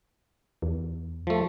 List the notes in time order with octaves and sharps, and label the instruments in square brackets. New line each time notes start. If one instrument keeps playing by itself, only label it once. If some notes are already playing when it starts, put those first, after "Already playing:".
[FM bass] E2
[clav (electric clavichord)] F3 A3